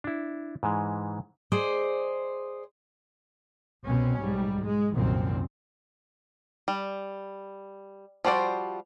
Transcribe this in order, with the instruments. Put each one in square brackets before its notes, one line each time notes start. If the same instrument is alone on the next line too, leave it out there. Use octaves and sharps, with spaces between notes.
[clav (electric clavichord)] D4 E4
G#2 E3 G#3
[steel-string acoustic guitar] G#4 C5 D5 D#5
[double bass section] C2 B2 C4 C#4
B1 G#2 G3
G#3
C2 F#2 A#2 D#3 C4
[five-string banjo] G3
F3 G3 F#4 C5 D5